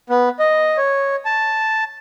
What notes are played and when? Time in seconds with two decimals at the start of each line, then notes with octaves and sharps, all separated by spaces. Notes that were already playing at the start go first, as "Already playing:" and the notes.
0.10 B3
0.39 D#5
0.77 C#5
1.25 A5